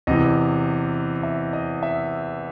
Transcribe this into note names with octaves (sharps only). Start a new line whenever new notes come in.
E2 C3 E3 D#5
E5
D#5
E5